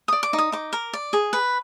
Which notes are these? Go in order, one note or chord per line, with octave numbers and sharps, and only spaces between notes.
D5 D#6
D6
D#4
D#6
D#4 D6
A#4
D5
G#4
B4